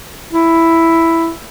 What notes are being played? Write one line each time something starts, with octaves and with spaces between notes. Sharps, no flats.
E4